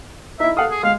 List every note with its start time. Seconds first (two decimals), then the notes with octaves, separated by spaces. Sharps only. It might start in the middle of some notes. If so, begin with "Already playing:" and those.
0.40 D#4 E4 E5
0.57 A4 F5 F#5 D#6
0.71 G#4
0.83 G#3 F5